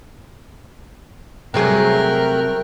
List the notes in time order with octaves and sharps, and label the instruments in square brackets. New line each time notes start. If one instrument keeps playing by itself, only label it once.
[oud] C3 F#3 G#4 [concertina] A3 G5 F#6 [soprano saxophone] A#4